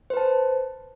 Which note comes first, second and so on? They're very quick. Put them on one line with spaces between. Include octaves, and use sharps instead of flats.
C5 B4 A5